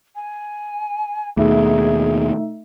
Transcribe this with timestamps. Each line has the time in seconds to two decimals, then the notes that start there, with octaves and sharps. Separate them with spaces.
0.15 G#5
1.37 D#2 B2 A3 D#4 G#4 E5